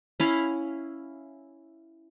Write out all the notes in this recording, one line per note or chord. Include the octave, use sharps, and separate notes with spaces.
C#4 E4 F5